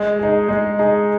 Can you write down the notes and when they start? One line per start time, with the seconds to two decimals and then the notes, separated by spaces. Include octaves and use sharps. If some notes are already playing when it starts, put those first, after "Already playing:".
Already playing: G#3
0.19 D#4 G#4
0.49 G#3
0.79 D#4 G#4